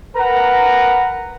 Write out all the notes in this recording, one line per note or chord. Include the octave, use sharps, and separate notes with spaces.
A#4 B4 F#5 A#5